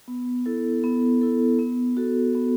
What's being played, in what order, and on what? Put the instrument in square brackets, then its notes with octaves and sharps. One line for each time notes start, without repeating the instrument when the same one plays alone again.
[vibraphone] B3
E4 A4
B3
E4 A4
B3
F#4 A4
B3